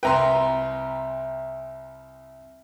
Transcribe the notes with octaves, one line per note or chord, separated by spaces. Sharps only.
C2 B4 G5 A#5 C6